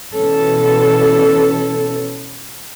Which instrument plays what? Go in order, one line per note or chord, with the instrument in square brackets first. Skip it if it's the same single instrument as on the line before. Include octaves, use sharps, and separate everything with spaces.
[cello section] B2 E3 C#4 A4